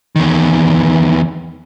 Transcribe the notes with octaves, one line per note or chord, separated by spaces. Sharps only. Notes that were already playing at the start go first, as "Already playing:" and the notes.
E2 D#3